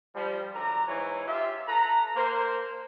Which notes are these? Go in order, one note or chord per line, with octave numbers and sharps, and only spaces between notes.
F3 G3
F#2 D3 A#5
G#2 E3 C#5
F4 G4 E5
A4 B4 A#5
A#3 C5